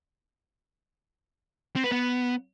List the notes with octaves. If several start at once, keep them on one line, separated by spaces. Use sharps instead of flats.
C4
B4
B3